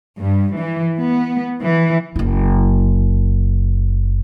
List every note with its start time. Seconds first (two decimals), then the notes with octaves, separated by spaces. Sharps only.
0.19 G2
0.58 E3
0.97 B3
1.62 E3
2.16 F#1 E4